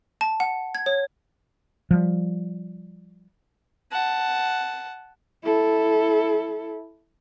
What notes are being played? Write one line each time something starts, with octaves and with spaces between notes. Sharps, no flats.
A5
F#5
G#6
C#5
F3 G3
F#5 A5
E4 A4